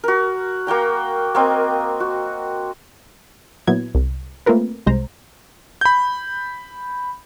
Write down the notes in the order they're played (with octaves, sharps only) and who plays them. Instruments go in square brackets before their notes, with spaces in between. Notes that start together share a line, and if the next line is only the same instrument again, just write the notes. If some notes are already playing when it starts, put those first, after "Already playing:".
[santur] F#4 A#4
A#3 F#4 G5 A#5
A#3 C4 D#5
F#4
[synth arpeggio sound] A#2 F#3 B3 E4 G#6
C2
A3 A#3 C4 F4 A#4 B4
C2 G#3 C5 A#5
[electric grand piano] B5 G6